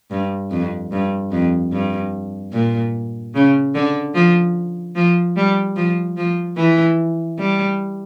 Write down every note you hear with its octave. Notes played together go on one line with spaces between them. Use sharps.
G2
F2
G2
F2
G2
A#2
C#3
D3
F3
F3
G3
F3
F3
E3
G3